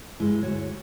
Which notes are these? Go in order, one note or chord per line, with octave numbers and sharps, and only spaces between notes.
G2 G#3 E4
D2 F#4 C#5